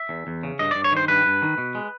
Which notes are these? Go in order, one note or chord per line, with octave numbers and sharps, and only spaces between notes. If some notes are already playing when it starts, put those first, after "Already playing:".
Already playing: E5
E2
E2
C#3
G2 D#5
G2 D5
C#5
D#3 C5
G2 B4
G2
D#3
B2
G#3